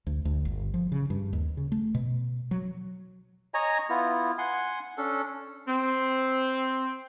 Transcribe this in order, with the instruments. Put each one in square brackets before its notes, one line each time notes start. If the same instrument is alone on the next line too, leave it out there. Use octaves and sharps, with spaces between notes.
[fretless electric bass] D2
D2
G1
F3
C#3
G2
D#2
C#3
A3
B2
F#3
[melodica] C#5 D#5 G#5 A#5
B3 E4 F4
F#5 G#5 C6
C#4 D4 A4
[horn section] C4